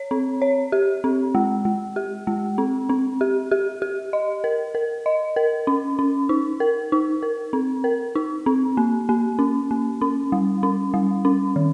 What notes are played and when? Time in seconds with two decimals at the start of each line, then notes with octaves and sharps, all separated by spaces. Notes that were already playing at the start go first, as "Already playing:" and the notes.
Already playing: C#5
0.11 C4
0.42 C#5
0.72 G4
1.04 C4
1.35 G#3
1.65 G#3
1.96 G4
2.27 G#3
2.58 C4
2.89 C4
3.21 G4
3.51 G4
3.82 G4
4.13 D#5
4.44 A#4
4.75 A#4
5.06 D#5
5.36 A#4
5.67 C#4
5.99 C#4
6.29 D#4
6.60 A#4
6.92 D#4
7.23 A#4
7.53 C4
7.84 A#4
8.15 D#4
8.46 C4
8.77 A#3
9.09 A#3
9.39 C#4
9.71 A#3
10.01 C#4
10.32 G3
10.63 C#4
10.94 G3
11.25 C#4
11.56 D#3